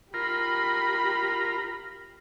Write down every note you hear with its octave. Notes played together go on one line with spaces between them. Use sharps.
F4 G4 A#4 B5